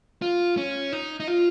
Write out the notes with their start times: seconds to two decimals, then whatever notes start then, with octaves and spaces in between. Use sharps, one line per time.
0.22 F4
0.57 C#4
0.92 D#4
1.20 D#4
1.28 F4